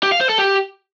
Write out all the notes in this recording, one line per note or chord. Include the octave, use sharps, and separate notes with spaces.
G4
F5
C5
A4
G4